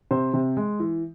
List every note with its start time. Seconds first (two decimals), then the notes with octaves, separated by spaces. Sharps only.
0.11 C3 C5
0.34 C3
0.57 G#3
0.80 E3